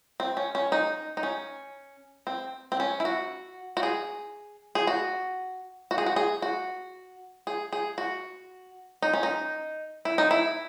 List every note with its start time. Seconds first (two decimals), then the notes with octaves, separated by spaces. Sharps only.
0.20 C4
0.37 C#4
0.55 C#4
0.72 D#4
1.17 D#4
1.23 C#4
2.27 C4
2.72 C4
2.80 C#4
3.00 E4
3.05 F#4
3.77 F#4
3.83 G#4
4.75 G#4
4.87 F#4
5.91 F#4
5.98 G#4
6.06 F#4
6.16 G#4
6.42 F#4
7.47 G#4
7.73 G#4
7.98 F#4
9.02 D#4
9.13 C#4
9.23 D#4
10.05 E4
10.18 D#4
10.31 E4